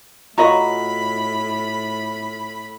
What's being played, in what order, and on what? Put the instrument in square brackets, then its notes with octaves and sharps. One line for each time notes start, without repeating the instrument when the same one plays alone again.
[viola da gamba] A2 [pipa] F#3 A#5 C#6 [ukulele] F4 F#4 D#5 [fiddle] B5